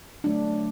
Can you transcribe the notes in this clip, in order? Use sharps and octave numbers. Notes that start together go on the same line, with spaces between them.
D3 F#3 A3 D4